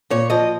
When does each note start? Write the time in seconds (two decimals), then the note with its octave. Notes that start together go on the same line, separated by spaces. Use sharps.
0.10 A#2 C#5
0.30 F3 D#5